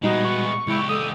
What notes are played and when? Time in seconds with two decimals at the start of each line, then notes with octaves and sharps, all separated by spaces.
0.03 A#2 G3 G#3 B3 D#4 F#4
0.25 C#6
0.67 C#2 G#3 E4 G4
0.89 A4 D#6